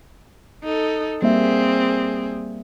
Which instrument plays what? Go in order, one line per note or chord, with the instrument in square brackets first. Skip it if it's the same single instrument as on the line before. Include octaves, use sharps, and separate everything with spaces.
[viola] D#4 A4
[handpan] G3 A#3 E5 [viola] C4 G#4